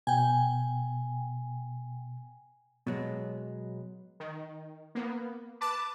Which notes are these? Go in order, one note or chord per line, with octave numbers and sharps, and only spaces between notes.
B2 G5 G#5
B2 F#3 G#3
D#3
A#3 B3
B4 A5 D6